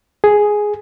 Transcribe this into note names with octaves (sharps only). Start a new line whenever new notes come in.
G#4